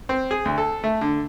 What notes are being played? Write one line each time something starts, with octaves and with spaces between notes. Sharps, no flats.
C4
G#4
D2
A4
A3
D3